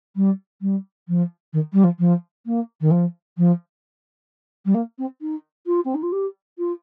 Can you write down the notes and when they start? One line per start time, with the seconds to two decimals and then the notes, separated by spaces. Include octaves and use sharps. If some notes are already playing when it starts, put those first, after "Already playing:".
0.16 G3
0.61 G3
1.08 F3
1.53 D#3
1.73 G3
1.84 F3
1.99 F3
2.46 A#3
2.81 D#3
2.91 F3
3.37 F3
4.65 G3
4.74 A#3
4.98 C4
5.21 D#4
5.66 F4
5.85 C4
5.94 D#4
6.03 F4
6.12 G4
6.58 F4